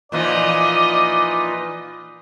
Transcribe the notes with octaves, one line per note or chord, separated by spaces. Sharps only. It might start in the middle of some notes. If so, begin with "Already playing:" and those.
A#2 E3 F3 D#4 F4 B4 D5 D#5